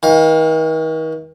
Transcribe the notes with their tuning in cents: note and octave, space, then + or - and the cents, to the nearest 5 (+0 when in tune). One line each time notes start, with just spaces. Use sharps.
D#3 +45 F5 +25